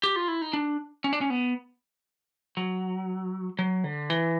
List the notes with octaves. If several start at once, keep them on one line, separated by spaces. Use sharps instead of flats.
G4
F4
E4
D#4
D4
C#4
D4
C#4
B3
F#3
F#3
D3
E3